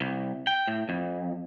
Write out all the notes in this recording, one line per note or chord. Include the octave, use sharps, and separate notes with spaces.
C2
G5
A2
F2